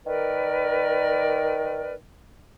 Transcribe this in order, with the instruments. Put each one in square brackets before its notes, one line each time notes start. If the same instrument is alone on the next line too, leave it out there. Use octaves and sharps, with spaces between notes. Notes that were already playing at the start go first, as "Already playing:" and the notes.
[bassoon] D#3 [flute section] A#4 B4 D5